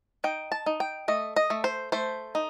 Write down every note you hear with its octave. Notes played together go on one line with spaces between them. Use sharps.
D#4 G5
A5
D#4
G5
A3 D#5
D#5
A3
C5
A3 C5
D#4